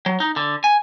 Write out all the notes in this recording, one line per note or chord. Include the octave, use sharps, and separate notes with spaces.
F#3
D#4
D3
G#5